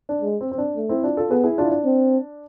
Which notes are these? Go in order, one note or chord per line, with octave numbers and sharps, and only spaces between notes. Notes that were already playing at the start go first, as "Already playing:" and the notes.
D4
G#3
C4
C4
D4
A3
C4 E4
D4 F4
F4 A4
B3 G#4 B4
E4 G#4
D4 F4
E4
D4
C4